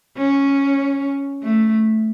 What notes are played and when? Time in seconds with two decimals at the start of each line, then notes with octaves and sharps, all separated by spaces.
0.17 C#4
1.43 A3